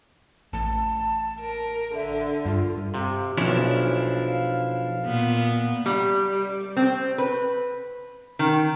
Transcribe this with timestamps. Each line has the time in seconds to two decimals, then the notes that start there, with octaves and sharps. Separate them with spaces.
0.53 A1 A2 A5
1.40 A#4
1.95 D3 E5
2.45 G2 F4
2.94 C3 F5
3.38 B1 F3 C#4 D4 E4
5.05 A#2 B3
5.86 G3
6.77 C4
7.18 B4
8.39 D#3